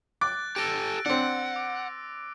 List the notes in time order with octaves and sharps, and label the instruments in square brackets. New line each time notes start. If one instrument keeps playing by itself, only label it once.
[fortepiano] D6 [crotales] F#6 A6
[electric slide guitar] G4 A4 [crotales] E6 A#6 D7
[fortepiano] C4 D4 [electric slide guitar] F#5
[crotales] D6